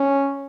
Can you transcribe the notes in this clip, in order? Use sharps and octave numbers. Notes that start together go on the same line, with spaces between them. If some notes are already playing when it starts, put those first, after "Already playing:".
Already playing: C#4